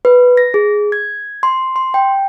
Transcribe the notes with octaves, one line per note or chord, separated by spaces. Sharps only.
B4
A#6
G#4
G#6
C6
C6
G5